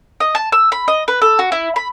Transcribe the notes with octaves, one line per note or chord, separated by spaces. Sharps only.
D#5
A5
E6
B5
D#5
B4
A4
F#4
E4
B5